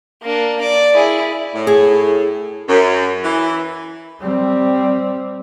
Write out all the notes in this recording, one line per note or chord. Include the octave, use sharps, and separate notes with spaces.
A#3 D4
D5
E4 G#4
A2
G#4
F#2
E3
G3 C4